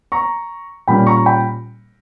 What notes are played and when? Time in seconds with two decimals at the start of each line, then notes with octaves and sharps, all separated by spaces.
0.12 A#5 C#6
0.87 A#2 G3 A#3 C#4 G5 B5
1.07 A#5 C#6
1.26 G5 B5